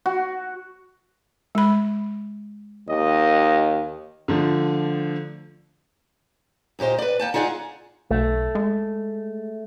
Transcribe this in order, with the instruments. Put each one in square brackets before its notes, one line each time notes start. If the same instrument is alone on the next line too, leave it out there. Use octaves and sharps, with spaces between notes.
[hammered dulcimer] F#4
[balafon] G#3 B5
[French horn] D#2 [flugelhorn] D#5
[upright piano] D3 F3 A3
[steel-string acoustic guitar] D2 A#2 G4 C5 D#5
B4 D5
A#3 G5 A5
D#4 F4 G#4 D5 E5 F#5
[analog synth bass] B1 [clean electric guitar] A3
[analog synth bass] G#3